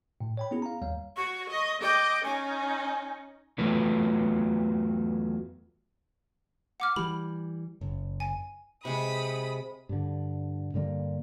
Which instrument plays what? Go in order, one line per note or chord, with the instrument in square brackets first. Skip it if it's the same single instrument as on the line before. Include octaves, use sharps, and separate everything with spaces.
[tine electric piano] A2
C#5 G5 B5
B3 C#4 E4 G#4
F5 A#5
D#2 G3 F5
[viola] F#4 [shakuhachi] C#6
[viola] D#5
[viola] D#5 G5 [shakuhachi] D6
[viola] C#4 D#4 [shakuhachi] G#5
[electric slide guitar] E2 F#3 A3 F4 B4
[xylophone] F#5 D6 F6
[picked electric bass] E3 G3 [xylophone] B5
[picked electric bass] F#1
[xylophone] G#5
[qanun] C3 G#3 [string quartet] B5 D#6
[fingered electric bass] G2 D3
G2 D3 G3 A#3